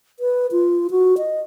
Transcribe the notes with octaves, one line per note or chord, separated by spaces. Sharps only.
B4
F4
F#4
D#5